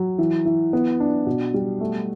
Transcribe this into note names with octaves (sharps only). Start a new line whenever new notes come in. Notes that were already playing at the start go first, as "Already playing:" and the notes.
Already playing: F#3
E3
E3
B3
D4
B2
G3
A3